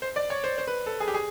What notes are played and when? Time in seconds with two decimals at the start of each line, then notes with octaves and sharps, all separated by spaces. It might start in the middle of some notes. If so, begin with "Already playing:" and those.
0.02 C5
0.16 D5
0.30 C#5
0.44 C5
0.58 C5
0.67 B4
0.86 A4
1.00 G#4
1.08 G4
1.14 G#4